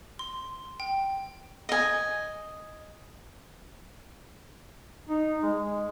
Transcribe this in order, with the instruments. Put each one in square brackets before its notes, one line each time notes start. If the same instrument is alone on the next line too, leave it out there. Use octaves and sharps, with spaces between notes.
[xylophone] C6
G5
[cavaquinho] D#5 G#5
[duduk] D#4
G#3
G#3